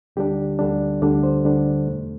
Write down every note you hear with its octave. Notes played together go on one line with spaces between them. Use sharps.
D2 D3 G3 D4 G4
D2 D3 G3 D4
D2 D3 G3 D4 D5
C5
D2 D3 G3 D4
E2 B2 A3